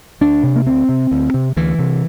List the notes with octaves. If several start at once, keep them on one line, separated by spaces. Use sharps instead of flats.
D2 D4
C3
A#3
D2 C4
C3
D2
C3
D2 E3
C3